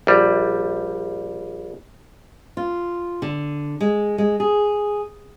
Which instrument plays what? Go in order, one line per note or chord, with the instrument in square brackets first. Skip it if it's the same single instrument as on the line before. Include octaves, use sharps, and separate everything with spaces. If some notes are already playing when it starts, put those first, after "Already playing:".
[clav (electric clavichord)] A#1 G3
[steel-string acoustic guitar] F4
D3
G#3
G#3
G#4